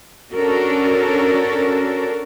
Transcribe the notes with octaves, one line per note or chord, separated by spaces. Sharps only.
C#4 D4 F#4 A4 A#4